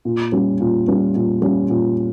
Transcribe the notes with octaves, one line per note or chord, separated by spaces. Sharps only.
A#2
G3 C#4
A#2
G3 C#4
A#2
G3 C#4
A#2